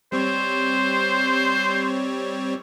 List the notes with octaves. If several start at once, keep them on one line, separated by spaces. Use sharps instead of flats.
G3 C4 C5 C#5